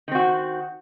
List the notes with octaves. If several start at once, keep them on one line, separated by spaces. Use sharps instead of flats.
D#3 C4 F#4